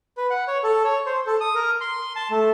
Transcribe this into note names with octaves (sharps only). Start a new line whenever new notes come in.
B4
F#5
C#5
A4
C#5
C5
A4
D#6
A#4
C6
A5
A3